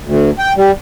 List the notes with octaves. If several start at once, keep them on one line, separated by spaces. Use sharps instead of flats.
D2
G5
G3